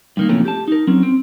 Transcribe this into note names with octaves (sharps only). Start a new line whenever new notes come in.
G2 D#3 A#3
F2 A#2 C#3 E3 A3 C#4
G4 A5
D#4 A#4
F#3 C4 C#4
C4